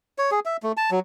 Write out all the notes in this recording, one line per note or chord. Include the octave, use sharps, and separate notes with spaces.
C#5
G#4
E5
A3
A5
F#3